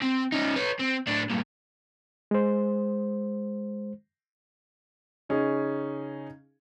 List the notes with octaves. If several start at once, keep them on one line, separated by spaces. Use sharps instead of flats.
C4
C#4 D#4
B4 C#5
C4
A2 D4
G2 A#2
G#3 C5
C#3 C#4 D#4 G#4